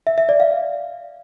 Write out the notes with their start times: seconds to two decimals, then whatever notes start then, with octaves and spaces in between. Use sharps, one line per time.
0.07 E5
0.18 E5
0.29 D5
0.40 F5